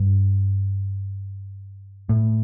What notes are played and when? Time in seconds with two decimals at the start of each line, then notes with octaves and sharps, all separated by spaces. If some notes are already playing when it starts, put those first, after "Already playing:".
Already playing: G2
2.09 A2